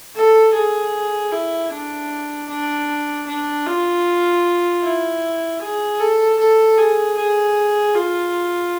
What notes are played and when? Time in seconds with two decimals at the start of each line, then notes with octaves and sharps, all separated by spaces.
0.15 A4
0.54 G#4
1.32 E4
1.72 D4
2.49 D4
3.27 D4
3.66 F4
4.83 E4
5.61 G#4
5.99 A4
6.39 A4
6.78 G#4
7.17 G#4
7.95 F4